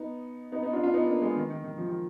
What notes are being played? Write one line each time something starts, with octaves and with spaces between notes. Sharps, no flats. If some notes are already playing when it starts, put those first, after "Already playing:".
Already playing: B3 D#4
B3 D#4
B3 D#4
D4 F4
D4 F4
B3 D#4
A#3 D4
G#3 B3
D#3
D#3
D#3
F3
D#3